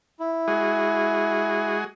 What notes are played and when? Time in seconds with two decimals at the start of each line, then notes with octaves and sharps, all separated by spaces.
0.20 E4
0.48 G#3 F#4 G#4